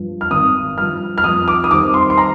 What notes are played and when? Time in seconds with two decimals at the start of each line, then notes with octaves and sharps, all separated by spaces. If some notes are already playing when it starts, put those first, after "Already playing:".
Already playing: G2 F3
0.21 F6
0.31 G#1 D#6
0.78 G2 F3 F6
1.18 F6
1.24 F2 D#6
1.48 D6
1.64 D#6
1.71 D#3 G3 C4 D6
1.94 C6
2.10 C6
2.18 A#5